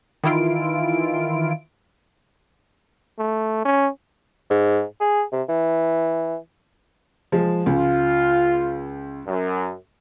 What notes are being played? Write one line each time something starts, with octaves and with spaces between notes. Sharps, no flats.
D#3 E3 E4 F4 D7
A3
C#4
G#2
G#4
C3
E3
F3 G#3
C#2 F4
F#2